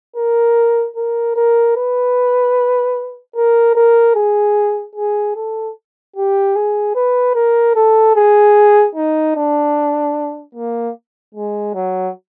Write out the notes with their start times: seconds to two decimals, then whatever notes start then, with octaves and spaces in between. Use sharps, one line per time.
0.16 A#4
0.96 A#4
1.36 A#4
1.76 B4
3.36 A#4
3.75 A#4
4.15 G#4
4.95 G#4
5.35 A4
6.16 G4
6.55 G#4
6.95 B4
7.35 A#4
7.75 A4
8.16 G#4
8.95 D#4
9.36 D4
10.55 A#3
11.34 G#3
11.74 F#3